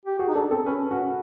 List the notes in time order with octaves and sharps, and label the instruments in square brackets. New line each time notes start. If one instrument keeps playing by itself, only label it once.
[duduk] G4
[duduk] F#4 [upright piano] G#4
[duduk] D#4
[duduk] D4 [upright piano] A4
[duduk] C4 [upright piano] A4
[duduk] C#4 [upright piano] B4
[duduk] C#4 [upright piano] F#4